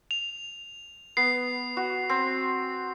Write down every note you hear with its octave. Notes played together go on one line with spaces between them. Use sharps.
F7
B3 C7
F#4
C4